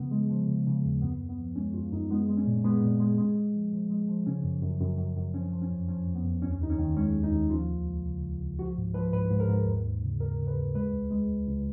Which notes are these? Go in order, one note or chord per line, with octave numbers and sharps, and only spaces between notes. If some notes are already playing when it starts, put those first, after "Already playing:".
Already playing: C#3 F3 B3
G#3
F3
C#3
C#3
D#2
F#2 B3
F#2
B3
F3
G#3 C#4
F#2 F4
F#2 D#4
G#3 B3
G#3
C#4
A#2
G#3 B3
A#2
G#3
G#3
G#3
F3
F3
G#3
F3
C#3 C#4
F#2
F#2
F#2
F#2
F#2
F3 C#4
F3
C#4
F2
F3 C#4
F2
B3
F2
D#2 C#4
D#2 D#4
C#4
D#3
G#3 C#4
D#2
D#4
D#2
F3 F4
C#2
C#2
C#3
C#2
C#2
F3 F#4
G#2
F3 B4
G#2 B4
G#2
A#4
G#2
D#2
D#2
C#3
D#2 A#4
C#3
B4
D#2
G#3 B4
C#2
G#3
C#2
C#2